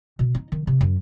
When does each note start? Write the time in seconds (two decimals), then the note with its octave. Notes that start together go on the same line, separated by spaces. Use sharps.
0.19 B2
0.35 D#4
0.52 D#3
0.67 C3
0.81 F#2